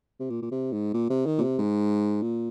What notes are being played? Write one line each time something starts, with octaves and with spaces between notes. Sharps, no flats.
C3
A#2
A#2
C3
G#2
A#2
C3
D#3
A#2
C3
G#2
A#2